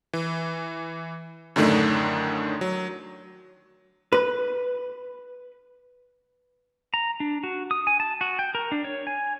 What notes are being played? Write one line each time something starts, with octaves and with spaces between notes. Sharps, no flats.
E3
F#2 A2 D3 D#3 A3 D4
F#3
B4
A#5
D4
F#4
D#6
G#5
A5
F#4
G5
A#4
D4
C#5
G#5